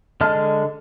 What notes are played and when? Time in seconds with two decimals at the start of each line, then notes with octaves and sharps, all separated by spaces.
0.21 D3 G#3 D#5 A5 F6